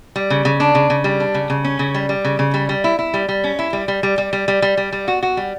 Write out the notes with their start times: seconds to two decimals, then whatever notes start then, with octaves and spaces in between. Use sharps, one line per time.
0.16 G3
0.30 C#3
0.45 C#3
0.60 D4
0.75 C#3
0.90 C#3
1.04 G3
1.20 D4
1.34 C#3
1.50 C#3
1.64 C#4
1.79 C#3
1.94 G3
2.09 G3
2.25 C#3
2.39 C#3
2.54 G3
2.69 G3
2.84 E4
2.99 E4
3.14 G3
3.29 G3
3.44 C#4
3.59 E4
3.73 G3
3.88 G3
4.03 G3
4.18 G3
4.33 G3
4.48 G3
4.62 G3
4.77 G3
4.93 G3
5.08 F#4
5.23 F#4
5.37 G3